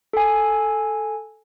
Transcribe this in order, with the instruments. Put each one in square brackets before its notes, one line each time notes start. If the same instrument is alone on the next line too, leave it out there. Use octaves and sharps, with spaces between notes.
[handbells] A4 G#5